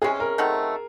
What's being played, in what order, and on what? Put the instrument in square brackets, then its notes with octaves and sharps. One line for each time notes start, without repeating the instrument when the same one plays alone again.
[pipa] C3 E3 G#3 C#4 [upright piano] G#4
[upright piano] A#4
[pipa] D#3 F#3 A3 C4